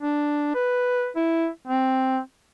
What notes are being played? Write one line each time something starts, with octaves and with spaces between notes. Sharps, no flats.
D4
B4
E4
C4